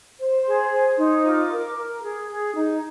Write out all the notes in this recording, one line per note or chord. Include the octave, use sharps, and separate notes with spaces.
C5
G#4
C5
D#4
F4 D6
A#4
A#4
G#4
G#4
D#4